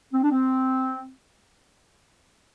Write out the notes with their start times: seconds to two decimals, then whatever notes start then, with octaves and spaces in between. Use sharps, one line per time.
0.12 C4
0.22 D4
0.31 C4